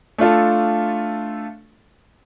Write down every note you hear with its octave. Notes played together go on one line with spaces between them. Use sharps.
A3 D4 F4 A4